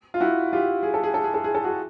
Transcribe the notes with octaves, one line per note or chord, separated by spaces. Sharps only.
F4
E4 F#4
F4 G4
G#4
A4
G#4
A4
G#4
A4
G#4
A4
F#4 G#4